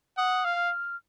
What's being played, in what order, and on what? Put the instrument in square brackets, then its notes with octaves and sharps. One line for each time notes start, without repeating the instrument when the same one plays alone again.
[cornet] F#5 [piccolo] D#6
[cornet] F5 [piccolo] F6